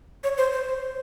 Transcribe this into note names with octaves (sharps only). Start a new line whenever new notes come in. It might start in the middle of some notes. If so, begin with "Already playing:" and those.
C#5
C5
C5